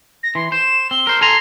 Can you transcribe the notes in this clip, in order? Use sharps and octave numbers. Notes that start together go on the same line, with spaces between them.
A#6
E3 C6
C5 E7
C4 G7
A#4 C5
A4 G#5 A#5 C6